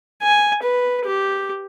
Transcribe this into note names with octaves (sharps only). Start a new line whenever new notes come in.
G#5
B4
G4